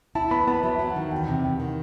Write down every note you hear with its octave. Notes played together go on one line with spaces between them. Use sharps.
E4 A5
B3 B5
B3 A5
F#3 E5
F#3 E5
F#5
D#3 A5
E2 G5
C3 G5
E2 G5
D#3 F#5